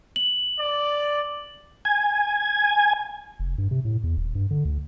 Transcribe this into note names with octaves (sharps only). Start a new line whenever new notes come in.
F#7
D5
G#5
F1
G2
C3
A2
E2
D#1
G2
D3
D2